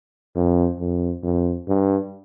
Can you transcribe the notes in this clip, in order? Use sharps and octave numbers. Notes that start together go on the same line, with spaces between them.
F2
F2
F2
G2